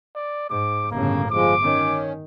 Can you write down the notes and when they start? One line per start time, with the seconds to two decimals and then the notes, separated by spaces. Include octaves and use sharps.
0.16 D5
0.50 G#2 D6
0.92 G1 A2 C#3 A#3
1.31 G1 F3 G#3 D6
1.62 D#3 C#4